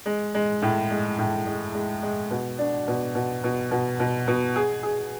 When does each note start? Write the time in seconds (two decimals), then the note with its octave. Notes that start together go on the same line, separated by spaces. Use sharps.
0.06 G#3
0.35 G#3
0.62 A2
0.91 G#3
1.18 A2
1.47 G#3
1.74 G#3
2.03 G#3
2.31 B2
2.59 D4
2.88 B2
3.15 B2
3.44 B2
3.71 B2
4.00 B2
4.28 B2
4.56 G#4
4.83 G#4